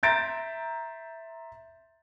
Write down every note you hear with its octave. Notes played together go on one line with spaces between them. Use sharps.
E5 A#5 C6 G6 A6 D7